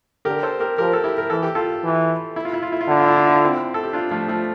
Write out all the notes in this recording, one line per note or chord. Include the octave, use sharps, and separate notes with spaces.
D3 G4 A#4
A4 C5
G4 A#4
F3 G4 A#4
A4
E4 G4
A#4
E3 A4
G4
F4 A4
E3
E4
F4
E4
F4
E4
F4
D3 E4
F4
E4
F4
E4
F4
C4 E4
A4
G4
D4 F4
F3 A3
F3 A3